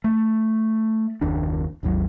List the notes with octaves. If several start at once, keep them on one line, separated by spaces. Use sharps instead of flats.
A3
F#1 D#2 D4
G#1 D#2 F#3